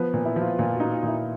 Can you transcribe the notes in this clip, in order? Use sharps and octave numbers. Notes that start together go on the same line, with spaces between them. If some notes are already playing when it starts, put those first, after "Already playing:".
Already playing: F3 B3
A#2
E4
F3
F4
A#2 F4
F#4
D#4
F4
A#2
E4